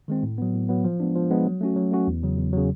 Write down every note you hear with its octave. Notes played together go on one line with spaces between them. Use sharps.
D#3 G#3 C4
A2
F#3 B3
A2
F#3 B3
F3
G#3 B3 D4
F3
G#3 B3 D4
F#3
A3 C#4 F#4
F#3
A3 C#4 F#4
E2
C#3 F#3
E2
C#3 F#3